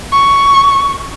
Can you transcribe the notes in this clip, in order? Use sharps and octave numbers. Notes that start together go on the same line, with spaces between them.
C#6